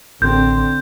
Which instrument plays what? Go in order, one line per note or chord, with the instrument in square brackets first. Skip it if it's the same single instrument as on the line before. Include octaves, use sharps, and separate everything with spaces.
[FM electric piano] A1 [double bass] D3 C4 [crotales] G6